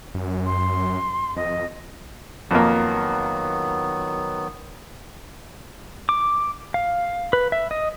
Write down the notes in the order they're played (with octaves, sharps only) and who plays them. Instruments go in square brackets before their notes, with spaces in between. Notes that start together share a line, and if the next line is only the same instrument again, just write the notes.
[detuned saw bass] F#2
[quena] C6
[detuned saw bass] F2 [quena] D#5
[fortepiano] F2 A#3 [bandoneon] D#3 F#3 B3
[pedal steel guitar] D6
F5
B4
E5
D#5